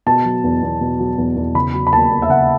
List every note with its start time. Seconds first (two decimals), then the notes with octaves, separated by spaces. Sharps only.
0.06 B2 A5
0.25 F#3
0.44 E2
0.63 E2
0.81 B2
0.99 F#3
1.18 E2
1.36 E2
1.55 C#3 B5
1.74 F#3
1.87 B5
1.93 D#2 A5
2.11 D#2
2.22 E5
2.29 C#3 F#5